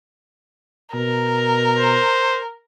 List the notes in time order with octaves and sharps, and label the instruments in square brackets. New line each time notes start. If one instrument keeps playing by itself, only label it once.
[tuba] B2 [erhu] A#4
[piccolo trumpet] C5